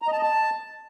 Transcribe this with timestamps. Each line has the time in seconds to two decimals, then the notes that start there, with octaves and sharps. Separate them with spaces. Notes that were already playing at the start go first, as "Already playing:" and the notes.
0.02 A#5
0.07 D#5
0.13 A5
0.18 D#5
0.23 A5